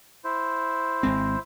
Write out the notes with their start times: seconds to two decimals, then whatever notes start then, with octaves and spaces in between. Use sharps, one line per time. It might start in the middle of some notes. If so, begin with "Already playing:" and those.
0.24 E4 C5
1.03 G#1 G#3 C4